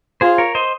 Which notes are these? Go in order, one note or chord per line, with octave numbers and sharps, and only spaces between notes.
F4 G#4 C5
A#4 C#5
C5 D#5